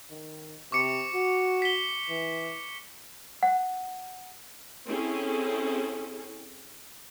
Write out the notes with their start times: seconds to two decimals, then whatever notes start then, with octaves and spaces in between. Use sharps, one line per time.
0.11 D#3
0.72 C3 C#6 D6 C#7
1.14 F#4
1.62 B6 G7
2.10 E3
3.43 F#5
4.87 C4 C#4 E4 G#4 A4